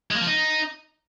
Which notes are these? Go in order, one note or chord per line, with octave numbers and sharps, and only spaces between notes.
G#3
A#3
F3
D#4